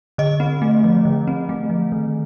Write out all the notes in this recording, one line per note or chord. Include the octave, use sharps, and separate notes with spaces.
D3 D#5
C4
A3
F3
D3
C4
A3
F3
D#3